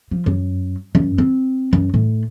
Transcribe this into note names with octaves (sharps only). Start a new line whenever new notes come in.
F3
F#2
F#2
C4
F#2
A2